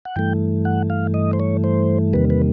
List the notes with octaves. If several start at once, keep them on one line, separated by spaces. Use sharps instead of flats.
F#5
G2 E3 A3 G5
F#5
F5
D#5
C5
C#5
C5
E2 C3 D#3 G3 A#3 B4
B4